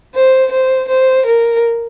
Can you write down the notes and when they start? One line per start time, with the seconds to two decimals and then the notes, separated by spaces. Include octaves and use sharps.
0.15 C5
0.51 C5
0.88 C5
1.26 A#4